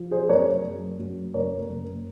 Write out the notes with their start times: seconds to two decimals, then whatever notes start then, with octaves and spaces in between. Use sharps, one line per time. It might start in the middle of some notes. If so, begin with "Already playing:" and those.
Already playing: F3
0.11 G#4 C5
0.29 F#2 A#4 C#5
0.64 F#2
0.99 F#2
1.34 F#1 A#4 C#5
1.58 A#4
1.70 F#1